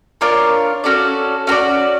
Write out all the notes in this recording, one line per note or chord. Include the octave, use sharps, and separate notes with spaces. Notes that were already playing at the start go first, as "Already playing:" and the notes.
D4 F4 A#4 C#5
C#4 F#4 A4 D5
C#4 F#4 A4 D5